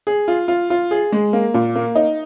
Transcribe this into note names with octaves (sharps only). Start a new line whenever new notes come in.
G#4
F4
F4
F4
G#4
G#3
A#3
A#2
A#3
D#4